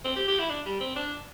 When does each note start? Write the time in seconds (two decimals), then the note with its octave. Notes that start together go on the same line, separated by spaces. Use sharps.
0.05 C4
0.16 G4
0.28 G4
0.39 E4
0.50 D4
0.66 G3
0.80 C4
0.96 D4